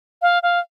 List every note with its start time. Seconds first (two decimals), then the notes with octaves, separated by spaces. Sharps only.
0.22 F5
0.43 F5